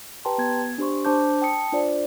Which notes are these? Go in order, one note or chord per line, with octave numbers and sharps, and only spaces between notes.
G4 B4 G5 A5 A#5 C6
B3 G#6
D4 G4 C5 C6 C#6
D4 C5 A5 D6 G6
G5 A5 D#6 C#7
D4 F4 C5 D5